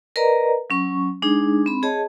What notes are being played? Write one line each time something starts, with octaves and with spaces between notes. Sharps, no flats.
A#4 B4 D5 D#5 A#5
F#3 C#4 C#6
G#3 D4 D#4 G#4
C4 B5
G#4 C#5 D#5 A5